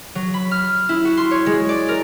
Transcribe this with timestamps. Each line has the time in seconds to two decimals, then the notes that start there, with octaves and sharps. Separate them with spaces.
0.15 F#3
0.34 B5
0.51 F6
0.89 E4
1.05 F#4
1.17 C6
1.31 C#5
1.46 G#3
1.69 D5
1.88 A#4